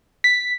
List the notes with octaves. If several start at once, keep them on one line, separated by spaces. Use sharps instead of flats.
B6